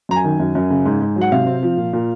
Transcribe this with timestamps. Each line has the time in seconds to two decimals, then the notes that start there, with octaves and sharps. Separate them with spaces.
0.09 F#2 A#5
0.16 G#5
0.24 D#3
0.40 F#2
0.55 F#2
0.70 C#3
0.86 G#2
1.01 G#2
1.16 F#3
1.21 F#5
1.32 C3 F5
1.46 C4
1.63 F3
1.77 A#2
1.93 A#2